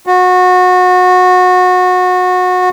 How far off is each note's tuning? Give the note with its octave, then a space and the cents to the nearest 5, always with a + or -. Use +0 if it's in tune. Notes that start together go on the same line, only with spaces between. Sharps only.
F#4 -25